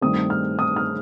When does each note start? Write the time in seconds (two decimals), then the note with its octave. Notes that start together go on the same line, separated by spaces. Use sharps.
0.01 G2 D#3 A3 C4 D#6
0.30 F6
0.59 D#6
0.76 F6